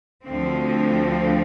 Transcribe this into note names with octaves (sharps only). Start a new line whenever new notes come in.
D2 D3 F3 C4